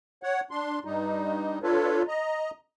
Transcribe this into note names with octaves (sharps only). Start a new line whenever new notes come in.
C#5 F#5
D4 C6
G2 G3 D#4
D4 F4 A4 B4 C#5
D#5 A#5